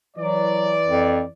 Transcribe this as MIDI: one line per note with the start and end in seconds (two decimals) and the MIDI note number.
0.17 1.28 52
0.17 0.73 54
0.17 1.28 74
0.86 1.22 41